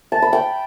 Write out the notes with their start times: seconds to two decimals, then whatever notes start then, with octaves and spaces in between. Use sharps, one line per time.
0.12 A5
0.22 B5
0.33 G5